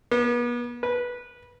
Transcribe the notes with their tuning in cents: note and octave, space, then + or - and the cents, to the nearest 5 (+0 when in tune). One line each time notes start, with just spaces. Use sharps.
B3 -40
B4 -15